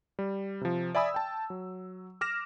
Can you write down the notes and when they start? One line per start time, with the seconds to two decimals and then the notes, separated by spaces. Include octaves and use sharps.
0.19 G3
0.61 C3 F3
0.95 D5 E5 G#5 B5 D#6 E6
1.14 G5 A5
1.50 F#3
2.21 D6 F6 A#6 E7